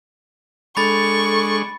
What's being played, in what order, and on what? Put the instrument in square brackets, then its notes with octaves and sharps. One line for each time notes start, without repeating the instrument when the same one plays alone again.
[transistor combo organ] G#3 D4 [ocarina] A4 [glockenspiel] B5 A6 [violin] C#6